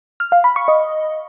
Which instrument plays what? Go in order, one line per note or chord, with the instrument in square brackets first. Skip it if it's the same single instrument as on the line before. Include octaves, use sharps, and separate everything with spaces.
[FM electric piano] F6
F5
B5
C#6
D#5